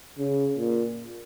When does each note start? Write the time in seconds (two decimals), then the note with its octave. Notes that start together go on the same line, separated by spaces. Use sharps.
0.18 C#3
0.57 A#2